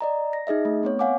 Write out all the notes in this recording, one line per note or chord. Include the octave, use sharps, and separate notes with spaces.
D5 D#5 A#5
A#6
D#4 G#4 D#5 E5
A3
B3 C4 C#5
C#5 F5 F#5 G#5 D6